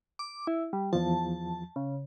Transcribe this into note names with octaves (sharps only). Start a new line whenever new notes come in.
D6
E4
G3
E2 F3 A5
C#3